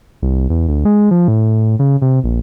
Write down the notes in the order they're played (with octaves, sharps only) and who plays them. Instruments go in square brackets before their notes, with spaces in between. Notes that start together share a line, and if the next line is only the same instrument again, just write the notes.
[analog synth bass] C2
E2
D2
G#3
F3
A2
C#3
C3
A#1